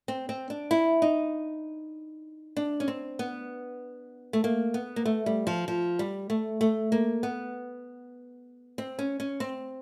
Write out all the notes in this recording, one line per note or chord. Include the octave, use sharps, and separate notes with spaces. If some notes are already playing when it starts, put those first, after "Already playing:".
C4
C4
D4
E4
D#4
D4
C#4
C4
B3
A3
A#3
B3
A#3
A3
G3
F3
F3
G3
A3
A3
A#3
B3
C4
C#4
C#4
C4